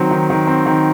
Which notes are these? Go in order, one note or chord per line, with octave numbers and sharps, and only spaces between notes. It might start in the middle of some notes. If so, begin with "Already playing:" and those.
Already playing: D#3 F#3 C4 F#4
D#3
D#3
C4
D#3